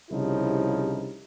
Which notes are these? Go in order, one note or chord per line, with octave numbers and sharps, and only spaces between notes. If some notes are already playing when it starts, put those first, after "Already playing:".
C2 C#3 F3 D#4 E4 G4